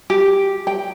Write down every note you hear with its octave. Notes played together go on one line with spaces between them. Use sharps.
G4
G5